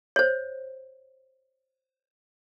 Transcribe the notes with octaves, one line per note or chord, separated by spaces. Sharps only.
C5 C#5